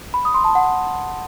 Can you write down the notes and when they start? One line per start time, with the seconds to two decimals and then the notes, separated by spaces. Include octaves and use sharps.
0.14 B5
0.25 D#6
0.34 C6
0.44 A5
0.55 F#5